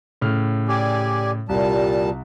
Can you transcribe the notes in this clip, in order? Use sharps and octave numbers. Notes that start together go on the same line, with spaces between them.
A2 C#3 F6
G4 D5 G#5
C2 A#2 G3 A5